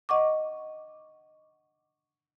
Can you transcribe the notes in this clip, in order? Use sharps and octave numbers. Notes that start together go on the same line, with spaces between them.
D#5 F#5 C#6 D6